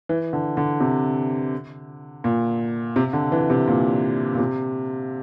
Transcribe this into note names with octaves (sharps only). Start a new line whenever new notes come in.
E3
D3
D3
C3
A#2
C3
D3
E3
C3
A#2
A#2
C3